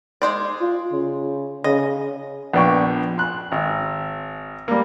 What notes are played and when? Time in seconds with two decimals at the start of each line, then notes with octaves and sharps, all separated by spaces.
0.22 G#3 C5 D5
0.61 F4
0.92 C#3
1.64 C#3 D#5
2.53 A#1 B3 D5 G5 C#6
3.18 C6 F#6
3.52 G#1
4.68 G3 A#3